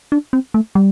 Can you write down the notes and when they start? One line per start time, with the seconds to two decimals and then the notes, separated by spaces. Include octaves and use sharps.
0.12 D4
0.33 C4
0.54 A3
0.75 G3